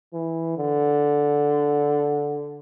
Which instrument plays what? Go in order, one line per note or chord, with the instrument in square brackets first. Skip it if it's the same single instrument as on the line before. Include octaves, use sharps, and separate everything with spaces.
[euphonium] E3
D3